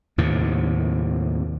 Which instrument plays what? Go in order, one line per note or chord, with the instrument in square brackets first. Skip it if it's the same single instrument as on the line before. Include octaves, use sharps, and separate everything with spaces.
[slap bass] D#2 A2 C3